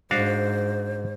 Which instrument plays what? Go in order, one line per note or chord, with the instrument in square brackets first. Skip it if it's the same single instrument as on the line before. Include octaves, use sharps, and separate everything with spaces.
[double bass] G#2 [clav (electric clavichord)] D4 F#4 F5 [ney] C5